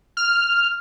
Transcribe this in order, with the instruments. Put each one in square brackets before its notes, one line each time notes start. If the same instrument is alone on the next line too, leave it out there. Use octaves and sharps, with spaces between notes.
[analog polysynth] F6